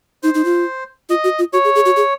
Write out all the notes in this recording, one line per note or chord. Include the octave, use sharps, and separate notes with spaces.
D#4 C5
D#4
F4
F4 D#5
F#4
F4
F#4 C#5
G#4
G#4
F#4
G#4